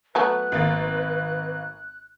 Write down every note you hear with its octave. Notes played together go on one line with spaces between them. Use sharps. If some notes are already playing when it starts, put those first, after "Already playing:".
F#3 A3 B3 B4 F#6
G#1 A#3 A6